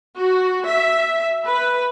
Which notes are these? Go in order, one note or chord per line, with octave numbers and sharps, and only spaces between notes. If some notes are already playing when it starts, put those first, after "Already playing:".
F#4
E5
B4